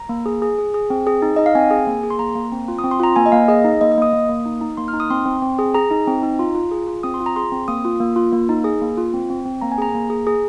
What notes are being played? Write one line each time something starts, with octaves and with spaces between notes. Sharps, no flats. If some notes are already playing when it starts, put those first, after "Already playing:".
Already playing: A#5
A#3
G#4
G#4
G#4
G#4
C4
G#4
D#4
D#4 D#5
F5
C4 G#5
G#4
A#3
G#4
C6
A#3 A#5
A#3
C4
F4
D#6
C4
C6
F4 A#5
A#3 G#5
D#5
A#3 F5
G#4 D#5
D#4
A#3 D#5
D#5
A#3 D#6
A#3
A#3
D#4
D#4
A#3 C6
F6
D#4
D#6
C4 C6
C4
C4
G#4
G#4 A#5
D#4
C4
D#4
F4
F4
G#4
F4
C4 D#6
C6
F4
A#5
G#4 C6
C4
A#3 D#6
F4
A#3
F4
A#3
D#4
G#4
A#3
F4
C4
C4
C4
A#3 A#5
G#5
G#4 A#5
A#3
G#4
G#4